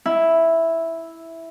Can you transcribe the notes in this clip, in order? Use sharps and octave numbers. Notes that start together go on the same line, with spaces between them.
E4